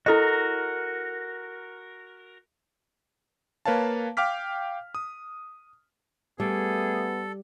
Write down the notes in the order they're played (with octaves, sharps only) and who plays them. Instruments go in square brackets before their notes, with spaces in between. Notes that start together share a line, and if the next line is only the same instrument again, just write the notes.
[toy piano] E4 A4 D#5 [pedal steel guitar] F#4 A#4
[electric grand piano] A#3 B4 C#5 F5 A5
F5 G5 D6 F6 B6
D#6
[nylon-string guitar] G3 [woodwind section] A3 G#4 [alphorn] B3 [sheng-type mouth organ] A4